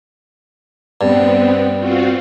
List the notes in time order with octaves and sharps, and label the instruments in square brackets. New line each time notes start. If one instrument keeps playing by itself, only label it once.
[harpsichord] G2 [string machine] B3 C4
[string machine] C4 F4 F#4